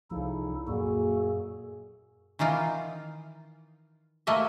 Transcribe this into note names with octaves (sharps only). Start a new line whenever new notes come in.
C2 C#3 F3 D#4 E4 A4
F#2 A#2 A#3 F#4 G#4 A4
D#3 E3 D#4 F4
A3 A#3 D#5 E5